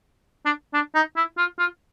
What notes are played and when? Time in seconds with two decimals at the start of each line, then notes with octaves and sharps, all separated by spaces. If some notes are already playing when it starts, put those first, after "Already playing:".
0.46 D4
0.73 D4
0.95 D#4
1.16 E4
1.38 F4
1.59 F4